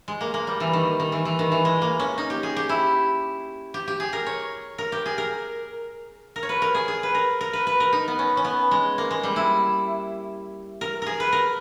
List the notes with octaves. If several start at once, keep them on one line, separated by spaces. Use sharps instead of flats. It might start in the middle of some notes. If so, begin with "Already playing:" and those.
G#3
A#3
A#3
G3
E3
D#3
D#3
E3
E3
D#3
E3
G#3
A#3
C#4
D#4
G4
G#4
G4
E4
G4
G4
G#4
A#4
C#5
A#4
G4
G#4
A#4
A#4
C#5
B4
A#4
G#4
G#4
B4
A#4
A#4
B4
B4
A#4
D#4
B3
C#4
C#4
B3
G#3
A#3
G#3
G3
E4
A#4
G#4 A#4
B4
A#4